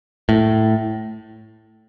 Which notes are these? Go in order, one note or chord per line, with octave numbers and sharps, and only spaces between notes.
A2